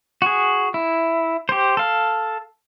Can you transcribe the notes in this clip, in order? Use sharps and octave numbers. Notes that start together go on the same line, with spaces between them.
F#4 G#4
E4
G4 C5
A4 F5